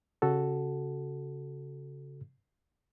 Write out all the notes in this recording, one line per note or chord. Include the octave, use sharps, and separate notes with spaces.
C#3 F#4 A4